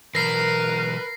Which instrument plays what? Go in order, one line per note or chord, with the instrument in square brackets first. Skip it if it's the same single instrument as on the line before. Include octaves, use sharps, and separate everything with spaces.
[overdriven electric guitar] B1 E2 [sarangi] A#4 [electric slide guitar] B4 [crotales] A#6 C7